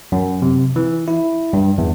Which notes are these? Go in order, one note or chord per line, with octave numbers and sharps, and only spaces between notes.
F#2
C3
E3
E4
G2
E2